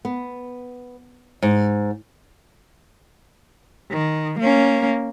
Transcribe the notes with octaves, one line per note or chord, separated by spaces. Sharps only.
B3
G#2
D#3
A#3 C#4